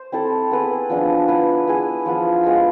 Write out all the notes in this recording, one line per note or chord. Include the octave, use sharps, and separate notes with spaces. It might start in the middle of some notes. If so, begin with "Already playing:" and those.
Already playing: C5
C4 E4 A4
B3 E4 G#4 B4
F3 B3 D4 G#4
B3 E4 B4
B3 E4 G#4
F3 B3 F4
G#3 B3 F4